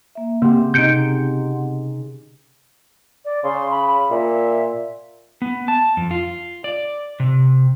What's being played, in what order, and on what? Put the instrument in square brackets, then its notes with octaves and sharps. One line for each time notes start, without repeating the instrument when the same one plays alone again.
[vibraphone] A#3 E5
[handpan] C#3 G4 [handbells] A#3 [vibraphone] C4 F#5 C6
[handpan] C3 D#4 [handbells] G6 C#7 D7
[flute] D5
[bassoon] C#3 [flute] C6
[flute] B5
[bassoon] A#2 [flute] E5
[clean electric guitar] B3
A5
F2
F4
D5
C3